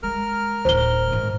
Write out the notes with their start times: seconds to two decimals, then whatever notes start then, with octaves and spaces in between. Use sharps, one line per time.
0.03 G#3 A#4 F6
0.65 D1 D#3 C5 G7
1.12 G#2 D#3